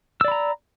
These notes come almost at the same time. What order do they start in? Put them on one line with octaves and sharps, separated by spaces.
E6 D5 B5 A#5